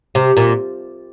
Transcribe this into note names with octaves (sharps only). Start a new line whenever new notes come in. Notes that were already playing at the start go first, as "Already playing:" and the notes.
C3
A#2